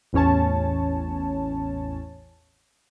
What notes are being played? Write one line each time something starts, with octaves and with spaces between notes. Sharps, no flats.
A1 E2 C#4 C#5 A5